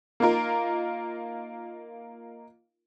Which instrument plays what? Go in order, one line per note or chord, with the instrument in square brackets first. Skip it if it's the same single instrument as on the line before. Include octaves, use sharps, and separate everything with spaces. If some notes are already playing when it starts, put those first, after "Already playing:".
[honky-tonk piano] A#3 D#4 F4 A#4